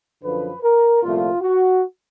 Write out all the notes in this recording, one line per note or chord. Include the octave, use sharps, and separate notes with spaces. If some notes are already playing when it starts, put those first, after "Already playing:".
F#2 D3 F3 B4
A#4
C2 A#2 F3 A3 F4
F#4